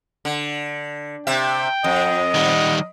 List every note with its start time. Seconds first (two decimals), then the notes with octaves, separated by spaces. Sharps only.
0.25 D3
1.27 C3 E5 G5
1.84 F2 D#5
2.34 D#3 G3 F#5